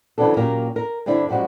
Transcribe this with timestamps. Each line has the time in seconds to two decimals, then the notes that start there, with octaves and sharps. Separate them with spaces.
0.18 C#3 E3 F#3 C4 D4 A4
0.37 A#2 F#3 A#3 C#4 G4 A#4
0.76 A#4
1.06 G2 D3 C4 D4 E4
1.28 F#2 F3 G3 G#3 F#4